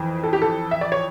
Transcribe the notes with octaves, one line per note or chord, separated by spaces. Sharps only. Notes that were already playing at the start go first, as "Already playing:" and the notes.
Already playing: F2 E3
A4
G4
A4
E5
D5
C#5